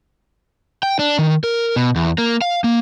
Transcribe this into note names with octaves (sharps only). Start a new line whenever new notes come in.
G5
D4
D#3
A#4
B2
E2
A#3
F5
A#3